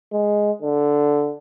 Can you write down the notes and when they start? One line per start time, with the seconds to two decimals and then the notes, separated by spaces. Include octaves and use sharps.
0.13 G#3
0.62 D3